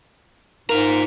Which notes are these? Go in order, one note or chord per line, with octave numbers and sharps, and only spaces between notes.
G#2 F4 A#4 A#5